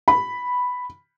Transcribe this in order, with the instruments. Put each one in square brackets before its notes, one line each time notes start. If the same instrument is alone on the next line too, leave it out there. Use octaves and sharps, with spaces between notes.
[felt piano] B5